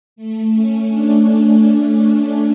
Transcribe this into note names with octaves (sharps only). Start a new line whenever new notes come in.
A3
C#4
D4